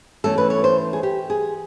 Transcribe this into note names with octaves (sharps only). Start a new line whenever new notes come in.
E3 A3 C#4 A4
B4
C#5
C5
G#4
G4
G#4